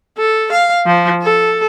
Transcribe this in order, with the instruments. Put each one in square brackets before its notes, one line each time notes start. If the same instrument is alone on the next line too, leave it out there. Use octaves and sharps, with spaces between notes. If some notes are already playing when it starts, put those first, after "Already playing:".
[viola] A4
F5
F3
A4